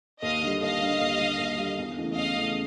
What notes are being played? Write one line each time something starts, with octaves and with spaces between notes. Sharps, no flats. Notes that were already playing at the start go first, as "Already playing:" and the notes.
D#2 D#5 F5
D3 G3
D#2 D#5 F5
D3 G3
D#2
D3 G3
D#2
D3 G3
E2
C#3 E3 A3
E2 D#5 F5
C#3 E3 A3